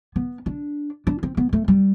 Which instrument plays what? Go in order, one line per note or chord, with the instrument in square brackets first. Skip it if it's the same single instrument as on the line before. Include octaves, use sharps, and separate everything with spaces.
[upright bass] B3
D4
D4
C4
B3
A3
G3